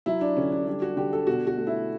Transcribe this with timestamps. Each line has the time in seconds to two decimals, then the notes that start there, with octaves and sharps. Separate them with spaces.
0.06 F#3 E4
0.21 D4
0.37 D3 C#4
0.52 D4
0.67 G3 D4
0.82 F#4
0.97 D3 G4
1.13 A4
1.27 B2 F#4
1.47 F#4
1.57 A3
1.67 E4